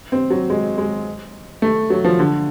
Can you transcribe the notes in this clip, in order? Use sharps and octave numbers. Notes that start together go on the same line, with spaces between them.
C4
F#3
G#3
G#3
A3
F#3
F3
D3